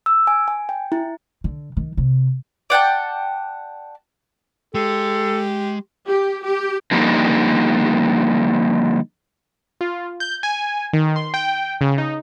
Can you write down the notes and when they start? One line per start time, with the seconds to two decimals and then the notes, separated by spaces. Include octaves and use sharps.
0.06 E6
0.27 G#5
0.48 G#5
0.69 G5
0.92 E4
1.44 D3
1.77 D#3
1.97 C3
2.70 D5 F#5 G5 A5
4.75 G#3 G4 A4
6.06 G4
6.44 G4
6.91 D3 F3 G3 A#3 D#4
9.81 F4
10.20 G6
10.43 G#5
10.93 D#3
11.16 C6
11.34 G5
11.81 C#3
11.98 D#4